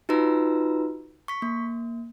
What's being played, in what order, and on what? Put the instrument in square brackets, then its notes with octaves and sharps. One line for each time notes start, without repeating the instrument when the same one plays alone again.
[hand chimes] D#4 F4 F#4 B4 A#5 E6
C#6 B6
A#3